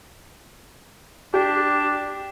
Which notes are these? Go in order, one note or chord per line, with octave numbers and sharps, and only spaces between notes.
D4 G4